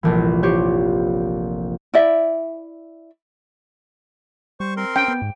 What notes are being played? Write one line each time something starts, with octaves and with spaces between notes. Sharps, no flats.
F1 A#1 E3
G4 C5 C#5
E4 D5 E5
G3 C5 C#6
C4 A#4 C6
C#4 G5
B3
G#2